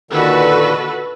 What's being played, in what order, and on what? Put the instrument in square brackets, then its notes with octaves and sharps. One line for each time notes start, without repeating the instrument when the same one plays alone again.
[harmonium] A#2 D3 D#3 [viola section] F#4 A4 B4